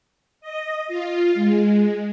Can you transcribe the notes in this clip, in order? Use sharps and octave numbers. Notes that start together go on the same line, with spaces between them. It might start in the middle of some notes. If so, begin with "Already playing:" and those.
D#5
F4
G#3